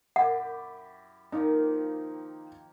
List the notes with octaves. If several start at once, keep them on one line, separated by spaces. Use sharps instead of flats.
F#2 E4 G4 F#5
D#3 F3 A#3 D#4